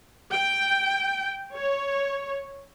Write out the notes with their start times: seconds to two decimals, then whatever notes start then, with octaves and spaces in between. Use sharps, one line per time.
0.32 G5
1.54 C#5